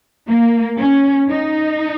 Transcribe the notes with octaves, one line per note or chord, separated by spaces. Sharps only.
A#3
C#4
D#4